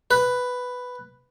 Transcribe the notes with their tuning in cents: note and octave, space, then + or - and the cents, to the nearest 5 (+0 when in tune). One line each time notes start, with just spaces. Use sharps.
B4 +5